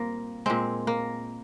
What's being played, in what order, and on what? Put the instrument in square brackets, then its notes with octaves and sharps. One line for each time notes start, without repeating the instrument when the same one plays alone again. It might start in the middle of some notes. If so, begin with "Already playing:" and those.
Already playing: [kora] A#2 G3 A#3 C4
A#2 G#3 C4
A#3